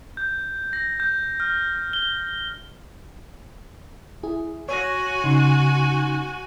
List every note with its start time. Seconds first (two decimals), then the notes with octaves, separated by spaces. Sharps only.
0.17 G6
0.73 A#6
1.00 G6
1.40 F6
1.93 G7
4.23 E4 G#4
4.69 F#4 C#5 G#5 A#6
5.24 C#3 D#4 C6